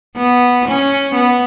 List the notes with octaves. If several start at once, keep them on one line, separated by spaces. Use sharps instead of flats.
B3
C#4
B3